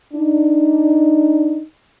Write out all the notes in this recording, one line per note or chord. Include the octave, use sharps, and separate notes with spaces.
D4 D#4